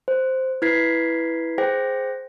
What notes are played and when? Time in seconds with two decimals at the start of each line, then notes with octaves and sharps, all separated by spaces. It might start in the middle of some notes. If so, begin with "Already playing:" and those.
0.08 C5
0.62 E4 B4 G#6 B6 C7
1.58 G#4 C5 G5 A#6